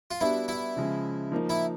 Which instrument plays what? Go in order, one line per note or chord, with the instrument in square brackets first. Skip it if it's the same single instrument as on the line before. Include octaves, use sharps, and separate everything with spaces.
[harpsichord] F4
[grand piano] G3 B3 D4 F#4 [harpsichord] E4
[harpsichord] E4
[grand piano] C#3 F3 G#3
F3 A#3 D#4
[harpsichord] E4